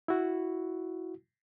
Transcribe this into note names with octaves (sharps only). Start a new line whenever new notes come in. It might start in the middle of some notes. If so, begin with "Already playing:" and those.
E4 F#4